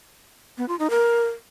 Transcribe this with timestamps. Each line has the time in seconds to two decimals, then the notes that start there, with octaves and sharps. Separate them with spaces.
0.58 B3
0.68 F4
0.79 D#4
0.90 A#4